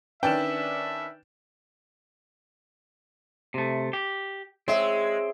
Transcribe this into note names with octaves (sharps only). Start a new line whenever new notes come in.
D#3 C#4 D4 B4 E5 G5 A6 E7
C3 A3
G4
G#3 C4 C#5 E5